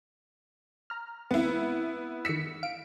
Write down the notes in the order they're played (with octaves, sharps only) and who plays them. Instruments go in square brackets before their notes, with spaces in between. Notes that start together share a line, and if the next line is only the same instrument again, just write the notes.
[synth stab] A#5 F6
[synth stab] E3 G#3 C4 [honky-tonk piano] B3 E4
[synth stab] D#3 E6 [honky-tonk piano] B6 C#7
[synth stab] F5 D7